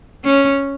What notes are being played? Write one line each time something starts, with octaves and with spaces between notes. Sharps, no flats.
C#4